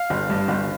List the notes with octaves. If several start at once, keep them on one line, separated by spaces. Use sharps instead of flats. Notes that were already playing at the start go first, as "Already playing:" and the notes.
Already playing: F5
G1
G2
G1